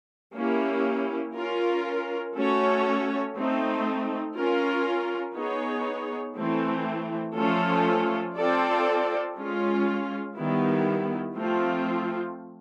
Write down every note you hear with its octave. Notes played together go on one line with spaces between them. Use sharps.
A#3 C#4 E4 G4
C#4 F4 A#4
A3 C#4 F#4 A4 C#5
A3 C4 D#4
C#4 F4 A#4
B3 D#4 G#4 C#5
E3 A3 C4
F3 A3 C#4 F4 A4
C4 F4 A4 D5
G#3 C#4 F4
D#3 G3 B3 E4
F3 A3 C4 F4